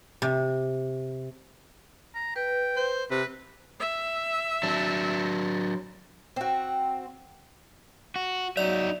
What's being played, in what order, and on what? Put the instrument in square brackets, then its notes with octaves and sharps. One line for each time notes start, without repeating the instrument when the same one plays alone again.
[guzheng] C3
[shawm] A#5
[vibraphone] B4 [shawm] G5
[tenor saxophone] C5
[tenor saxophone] C3 [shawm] B4
[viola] E5
[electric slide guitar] F#3 D4
[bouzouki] C4 F#4
[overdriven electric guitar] F#4
[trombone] F#3 [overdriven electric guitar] D#4 E5 [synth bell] D5 F7